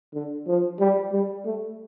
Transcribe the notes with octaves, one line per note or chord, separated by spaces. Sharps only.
D3
F3
G3
G3
A3